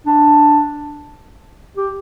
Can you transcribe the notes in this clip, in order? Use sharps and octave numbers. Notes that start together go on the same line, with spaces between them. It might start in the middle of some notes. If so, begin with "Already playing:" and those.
D4
G4